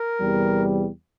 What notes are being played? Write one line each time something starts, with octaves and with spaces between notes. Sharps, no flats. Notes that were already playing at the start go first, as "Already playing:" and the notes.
Already playing: A#4
E2 C3 G3